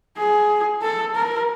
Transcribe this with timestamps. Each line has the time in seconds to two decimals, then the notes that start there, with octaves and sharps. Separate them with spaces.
0.17 G#4
0.82 A4
1.15 A#4